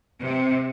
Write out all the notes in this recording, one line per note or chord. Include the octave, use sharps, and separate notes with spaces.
C3